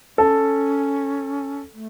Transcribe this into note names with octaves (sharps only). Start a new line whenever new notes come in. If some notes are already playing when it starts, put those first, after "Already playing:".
C#4 A4
A3